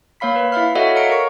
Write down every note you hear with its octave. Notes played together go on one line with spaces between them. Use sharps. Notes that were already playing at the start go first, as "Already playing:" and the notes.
A#3 C#5 F5 B5 B6
B4
E4 E5 F5 F6
F#4 A4 C#5 D#5 E5 F#5
C#5 F5 A#5 C#7 D7
A#4 C#6